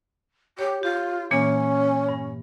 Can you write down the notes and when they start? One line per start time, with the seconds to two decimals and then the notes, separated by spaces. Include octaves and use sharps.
0.59 G4 C#5
0.83 F4 G4
1.31 A#2 E3 A#3 C#4
2.09 G2